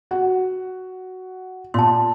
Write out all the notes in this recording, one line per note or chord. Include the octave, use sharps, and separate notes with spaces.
F#4 F#5
A#2 A5 C6